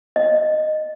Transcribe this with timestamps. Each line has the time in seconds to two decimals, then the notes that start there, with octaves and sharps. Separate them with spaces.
0.16 D#5